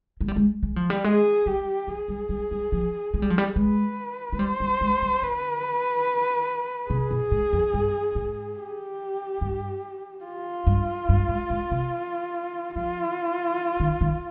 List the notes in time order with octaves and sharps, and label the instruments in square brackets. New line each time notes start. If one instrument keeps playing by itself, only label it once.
[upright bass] G#3
G3
G#3
G#3
F3
G3
[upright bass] G#3 [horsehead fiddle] G#4
[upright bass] G3 [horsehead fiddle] G4
[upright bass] F3 [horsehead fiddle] G#4
[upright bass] G3
G3
G3
F3
G#3
G3
F3
G3
[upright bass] G#3 [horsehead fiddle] B4
[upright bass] G#3
[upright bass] G3 [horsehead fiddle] C5
[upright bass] G3
G#3
G3
[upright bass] D3 [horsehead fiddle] B4
[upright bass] C3 [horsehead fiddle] G#4
[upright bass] B2
G#2
F2
G2
G#2
[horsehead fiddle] G4
[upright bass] G2
[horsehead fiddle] F4
[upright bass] G2
G2
G#2
G#2
C3
[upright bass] F3 [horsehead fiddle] F4
[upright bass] D#3
D#3